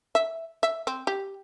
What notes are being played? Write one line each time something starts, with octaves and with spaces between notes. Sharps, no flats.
E5
E5
C4
G4